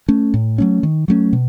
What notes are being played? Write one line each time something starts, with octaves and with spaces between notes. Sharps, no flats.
A3 C#4
A2
F#3 A3 C#4
D#3
F#3 A3 C#4
B2